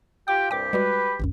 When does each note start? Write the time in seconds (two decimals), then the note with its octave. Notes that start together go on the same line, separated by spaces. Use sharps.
0.28 F4 G4 G5 D6
0.51 C2 G2 A#2 G4 G5 D6
0.73 G3 G#3 F#4 B4
1.20 G#1 C#2 F#2